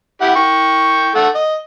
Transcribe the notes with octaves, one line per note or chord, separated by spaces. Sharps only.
E4 G4 F#5
G5 C#6
A3 F#5
D#5